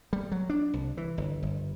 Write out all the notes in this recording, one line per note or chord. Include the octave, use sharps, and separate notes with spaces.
G3
F#3
D4
C2
E3
G1
G1